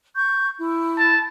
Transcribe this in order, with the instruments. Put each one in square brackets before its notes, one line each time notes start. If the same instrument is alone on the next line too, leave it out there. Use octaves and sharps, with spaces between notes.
[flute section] C#6 G6
E4
[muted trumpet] A5